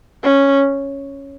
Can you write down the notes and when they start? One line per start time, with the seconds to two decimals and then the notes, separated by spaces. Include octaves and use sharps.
0.23 C#4